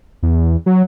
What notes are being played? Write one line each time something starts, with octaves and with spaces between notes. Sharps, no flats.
E2
F#3